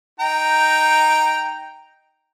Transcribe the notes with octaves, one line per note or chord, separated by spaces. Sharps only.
D#4 G5 A#5